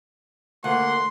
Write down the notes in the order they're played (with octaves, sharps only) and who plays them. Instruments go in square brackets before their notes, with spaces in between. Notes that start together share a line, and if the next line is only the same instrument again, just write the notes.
[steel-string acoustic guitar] D2 [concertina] A#3 F#5 F#6 [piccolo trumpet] C6